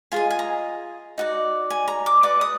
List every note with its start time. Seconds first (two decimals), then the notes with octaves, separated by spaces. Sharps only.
0.12 F4 G#4 D#5 G#5
0.30 G#5
0.39 A#5
1.18 D#4 F#4 D5
1.70 G#5
1.88 A#5
2.06 D6
2.23 F#4 B4 D5 D6
2.41 D#6